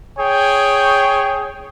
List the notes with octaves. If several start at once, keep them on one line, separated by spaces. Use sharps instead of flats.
G#4 C#5 G5